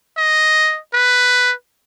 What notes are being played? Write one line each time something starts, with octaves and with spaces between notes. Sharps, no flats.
D#5
B4